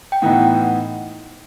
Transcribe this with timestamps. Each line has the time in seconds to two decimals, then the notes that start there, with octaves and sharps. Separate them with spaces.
0.12 G5
0.22 A2 E3 B3 D#4 F#5